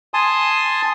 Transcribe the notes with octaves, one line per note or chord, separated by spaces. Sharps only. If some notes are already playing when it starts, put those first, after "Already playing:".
G#5 A5 C6 D#6